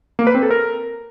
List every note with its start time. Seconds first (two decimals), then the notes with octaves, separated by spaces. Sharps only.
0.19 A#3
0.27 B4
0.35 C4
0.43 A4
0.51 A#4